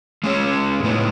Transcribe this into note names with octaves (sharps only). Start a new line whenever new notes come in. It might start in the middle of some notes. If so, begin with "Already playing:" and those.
G#3 C#4 G#4 C#5
A2 G#3 B3 D#4